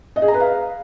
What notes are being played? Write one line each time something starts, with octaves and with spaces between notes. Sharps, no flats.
D#5
G#4
A#5
B4
F5